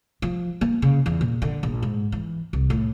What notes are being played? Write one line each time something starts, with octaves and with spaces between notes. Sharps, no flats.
F3
A#3
C#3
E2
A#2
D3
A#1
G#2
E3
C2
A2